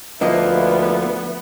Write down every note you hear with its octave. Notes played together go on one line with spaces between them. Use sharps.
D2 F3 A#3 B3 D4 E4 D#5